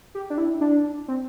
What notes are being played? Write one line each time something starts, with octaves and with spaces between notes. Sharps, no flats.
G4
D4
E4
D4
C4